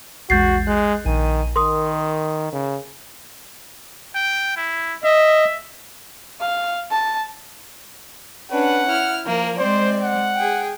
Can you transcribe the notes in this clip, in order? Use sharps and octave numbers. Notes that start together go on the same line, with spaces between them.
A#1 E2 G#3 F#4 G6 A6 C7
G#3 F#6
A#1 D#3 G#5 D#7
D#3 A#4 C6 D#6
C#3
G5
E4
D#5 E5
F5
A5
C#4 D4 B4 F#5
E4 F6
F3 A#3 A#4
G#3 C4 C5 D5
F#5
G#4 G5